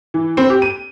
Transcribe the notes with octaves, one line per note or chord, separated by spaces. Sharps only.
E3
C4
G4
D#7